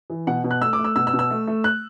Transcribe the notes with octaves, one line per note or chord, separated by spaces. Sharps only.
E3
B2 F#5
B2
F#6
A3 E6
D6
A3
E6
B2 E6
E6
B2
E6
A3
A3
F#6